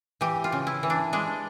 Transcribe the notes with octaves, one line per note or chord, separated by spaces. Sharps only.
E3 G4
F4
C#3
E4
E3
D4
G#3 D4